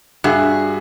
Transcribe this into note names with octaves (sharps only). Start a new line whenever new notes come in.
G2 F#4 G#4 E5